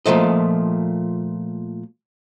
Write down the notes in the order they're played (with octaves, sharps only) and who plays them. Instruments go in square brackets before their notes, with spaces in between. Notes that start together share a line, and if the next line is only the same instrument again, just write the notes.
[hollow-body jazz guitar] A#2 F3 A3 D#5